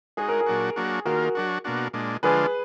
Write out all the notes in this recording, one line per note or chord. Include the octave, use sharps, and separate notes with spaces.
G#3 D#4 F#4 G#4
A#4
G#4
A#2 F#3 D4 F#4
F#3 A#3 D4 F#4
D#3 A#3 F4 F#4 A#4
F#3 D4 F#4
B2 A#3 D4 F#4
A#2 G#3 D4
D3 F3 G#3 D4 F4 G#4 B4